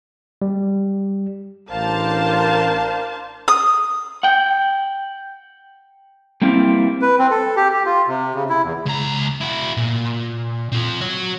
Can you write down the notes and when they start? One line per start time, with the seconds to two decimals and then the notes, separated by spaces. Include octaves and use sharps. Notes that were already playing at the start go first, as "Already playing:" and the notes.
0.42 G3
1.71 A1 D4 A#4 C5 F5 A5
3.48 D#6
4.23 F#5 G5
6.42 G3 A#3 C4 E4
7.02 B4
7.19 C4
7.31 A4
7.56 G4
7.73 G4
7.86 F4
8.07 C3
8.35 C#3
8.50 E4
8.63 E2
8.86 C#2 A#5
9.41 E4 F#4
9.77 A#2
10.72 C4 F4
11.01 F#4 C#5